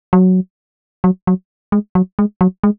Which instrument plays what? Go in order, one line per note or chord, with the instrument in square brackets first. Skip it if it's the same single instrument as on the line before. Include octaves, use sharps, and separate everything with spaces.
[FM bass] F#3
F#3
F#3
G#3
F#3
G#3
F#3
G#3